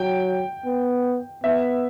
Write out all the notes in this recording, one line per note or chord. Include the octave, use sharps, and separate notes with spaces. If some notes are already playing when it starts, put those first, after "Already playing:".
Already playing: F#3 G5
B3
B3 E5